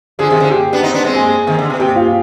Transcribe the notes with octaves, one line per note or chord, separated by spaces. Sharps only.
D3 F3 G#4 G#5
C3 D#3
D3 F3
G4 G5
B3 D4
C4 D#4
B3 D4
G#3 C4
G#4 G#5
C3 D#3
D3
B2
C3 G4 G5
F4 F5